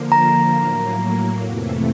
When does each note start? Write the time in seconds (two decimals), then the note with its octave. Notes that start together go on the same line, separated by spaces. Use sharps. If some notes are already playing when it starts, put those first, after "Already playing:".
Already playing: D3 F3 A#3
0.12 A#5
0.55 A2 F#3 A#3
1.43 F2 C3 E3 A3